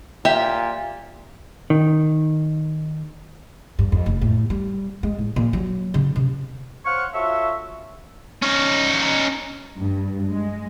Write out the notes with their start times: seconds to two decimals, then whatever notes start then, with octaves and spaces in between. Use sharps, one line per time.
0.25 A#2 G4 E5
1.70 D#3
3.79 G2
3.92 F2
4.06 F1
4.22 A2
4.50 G3
5.03 G#3
5.18 A2
5.36 A#2
5.53 F#3
5.94 C#3
6.16 C3
6.86 C5 C#5 F5 F#5 C#6
7.14 F4 F#4 A4 C#5 E5
8.43 C#4 D#4
9.77 G2
10.32 G#3